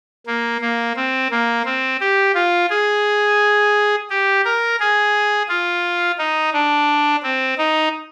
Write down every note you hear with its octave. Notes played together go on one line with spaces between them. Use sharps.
A#3
A#3
C4
A#3
C4
G4
F4
G#4
G4
A#4
G#4
F4
D#4
D4
C4
D#4